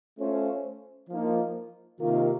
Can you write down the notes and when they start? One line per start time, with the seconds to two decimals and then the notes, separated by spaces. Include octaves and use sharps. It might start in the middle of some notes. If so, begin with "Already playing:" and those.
0.19 A3 C#4 F4 C5
1.09 F3 A#3 D#4
1.99 C3 D#3 A#3 F4